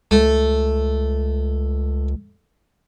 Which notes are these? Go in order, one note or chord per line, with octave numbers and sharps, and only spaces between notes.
C#2 A3